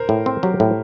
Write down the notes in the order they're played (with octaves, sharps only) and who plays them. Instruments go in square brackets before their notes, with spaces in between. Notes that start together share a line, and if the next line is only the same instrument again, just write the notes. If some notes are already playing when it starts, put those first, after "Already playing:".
Already playing: [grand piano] A#4 C5
[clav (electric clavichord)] A2
C4
[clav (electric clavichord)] F#3 [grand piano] G4
[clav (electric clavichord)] A2